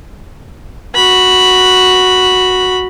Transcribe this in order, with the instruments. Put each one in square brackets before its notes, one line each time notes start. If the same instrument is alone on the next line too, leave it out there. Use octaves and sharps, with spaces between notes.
[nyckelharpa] F#4 B5